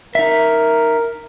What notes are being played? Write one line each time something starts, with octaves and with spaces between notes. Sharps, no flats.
D#4 A#4 E5